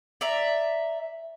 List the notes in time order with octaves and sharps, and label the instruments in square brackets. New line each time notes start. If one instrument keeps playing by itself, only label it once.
[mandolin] D5 E5 A#5